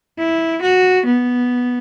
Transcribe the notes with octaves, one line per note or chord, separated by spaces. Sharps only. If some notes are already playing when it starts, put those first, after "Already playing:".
E4
F#4
B3